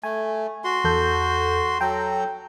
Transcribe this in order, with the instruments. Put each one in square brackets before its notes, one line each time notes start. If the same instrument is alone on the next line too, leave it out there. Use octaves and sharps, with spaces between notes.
[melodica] A3 [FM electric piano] G#5
[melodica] F#4 C6
[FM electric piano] E2 A4 G6
[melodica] F#3 A4 A#5 [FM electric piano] G5